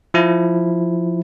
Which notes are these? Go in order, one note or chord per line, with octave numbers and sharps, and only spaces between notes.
F3 E4